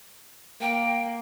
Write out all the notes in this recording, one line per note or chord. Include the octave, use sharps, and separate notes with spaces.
A#3 G5